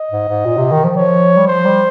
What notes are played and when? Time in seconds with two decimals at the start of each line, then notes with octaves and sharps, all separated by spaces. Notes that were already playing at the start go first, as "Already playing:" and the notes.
Already playing: D#5
0.11 G#2
0.28 G#2
0.46 A#2
0.57 C3
0.71 D#3
0.84 F3
0.97 F3 C#5
1.37 G3
1.48 F3 C5
1.65 G3